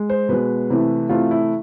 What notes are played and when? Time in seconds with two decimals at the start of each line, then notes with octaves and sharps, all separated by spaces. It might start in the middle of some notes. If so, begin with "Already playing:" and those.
Already playing: G#3
0.10 C5
0.29 B2 G#3 B4
0.70 C3 E3 A3
1.09 C3 E3 A3 F4
1.31 E4